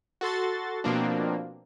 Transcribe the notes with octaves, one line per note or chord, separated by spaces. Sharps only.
F#4 A4 C6 A6
B2 F3 A#3 C4 D4